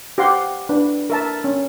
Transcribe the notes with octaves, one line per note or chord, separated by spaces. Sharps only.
G4 C5 F5 F#5 C6 D6
D4 B4
A#4 E5 A5
C#4